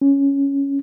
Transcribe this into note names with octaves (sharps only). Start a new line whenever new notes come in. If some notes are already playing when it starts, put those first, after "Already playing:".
C#4